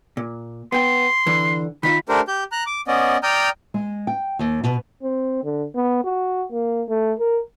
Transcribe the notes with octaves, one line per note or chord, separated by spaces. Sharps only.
A#2
B3 G5 C6
D3 E3
D#3 D#4 F4 B5
A3 D4 G4 A#4 C5
G4 G6
A#5 F#6
D6
B3 C#4 D5 D#5
D5 G5 A#5 D#6 F6 G6
G#3
G5
D#2
B2
C4
D3
B3
F#4
A#3
A3
A#4